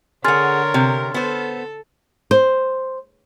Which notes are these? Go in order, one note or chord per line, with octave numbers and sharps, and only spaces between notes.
D3 G#4 A#4 C#5 F#5 C6 F6 A6
C3
B3 A4 C5
C5